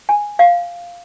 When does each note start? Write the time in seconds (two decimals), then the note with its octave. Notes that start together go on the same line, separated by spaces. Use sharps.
0.09 G#5
0.39 F5